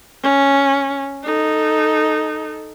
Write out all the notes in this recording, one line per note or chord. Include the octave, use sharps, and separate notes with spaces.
C#4
D#4 A4